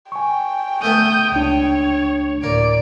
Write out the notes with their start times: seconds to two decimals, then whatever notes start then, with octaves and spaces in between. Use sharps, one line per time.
0.12 G5 G#5 C#6
0.82 D3 A3 B3 D#6 G6
1.32 C#2 D4 C#5
2.44 D2 A2 A#3 D5 D7